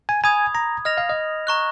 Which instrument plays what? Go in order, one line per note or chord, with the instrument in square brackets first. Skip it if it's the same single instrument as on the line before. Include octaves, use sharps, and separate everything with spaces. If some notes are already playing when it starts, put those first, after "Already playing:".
[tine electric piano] G#5
[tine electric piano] G#5 [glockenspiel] B5 D#6 G#6
[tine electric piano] A#5
[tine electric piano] D#5 [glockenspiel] F6 A#6 F7
[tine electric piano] F5
D#5
[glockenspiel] A#5 C#6 F#6